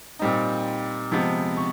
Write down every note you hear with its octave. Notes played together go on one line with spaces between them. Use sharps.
A#2 G3 C4 D#4
C3 F3 G#3 B3
C#6